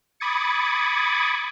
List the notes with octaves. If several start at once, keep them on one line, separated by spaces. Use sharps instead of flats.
B5 D6 D#6 G#6 A6 C#7